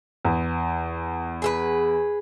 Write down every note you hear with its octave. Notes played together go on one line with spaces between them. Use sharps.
E2
G#4 A4 B4